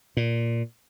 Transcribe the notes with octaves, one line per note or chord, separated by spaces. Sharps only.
A#2